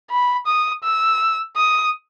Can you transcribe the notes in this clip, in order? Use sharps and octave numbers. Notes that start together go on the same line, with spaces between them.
B5
D#6
E6
D#6